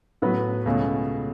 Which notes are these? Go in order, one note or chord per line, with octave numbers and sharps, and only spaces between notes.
A2 F#3 B3 F#4 B4
C#2 B2 A3 C#4 G#4